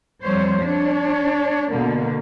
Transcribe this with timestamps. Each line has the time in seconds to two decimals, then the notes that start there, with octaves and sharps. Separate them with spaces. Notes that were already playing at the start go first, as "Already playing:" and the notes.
0.22 F2 G3 C5 C#5
0.61 D4 C#5
1.72 B2 D3 A#3